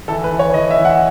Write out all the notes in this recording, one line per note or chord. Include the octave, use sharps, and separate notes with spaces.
E3 A4
B4
E3
C#5
E3 D#5
E5
E3
F#5